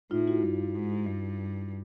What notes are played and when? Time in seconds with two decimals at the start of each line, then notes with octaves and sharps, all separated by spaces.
0.11 A2 D#4 F4
0.27 E4 F#4
0.43 G2
0.75 G#2
1.06 G2